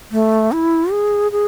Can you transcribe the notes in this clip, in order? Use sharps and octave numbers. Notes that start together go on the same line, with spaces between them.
A3
E4
G#4
G#4